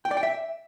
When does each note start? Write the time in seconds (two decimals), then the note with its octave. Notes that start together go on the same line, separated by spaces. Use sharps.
0.05 G5
0.11 D5
0.17 G5
0.23 E5